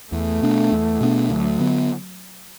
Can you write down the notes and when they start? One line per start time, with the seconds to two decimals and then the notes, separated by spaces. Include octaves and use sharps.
0.12 E2 A3
0.42 B2 B3 D4
0.72 E2
1.01 B2 B3 D4
1.30 D2 F#3
1.59 D3 B3